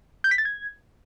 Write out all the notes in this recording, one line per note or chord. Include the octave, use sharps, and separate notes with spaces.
G6
B6
A6
G#6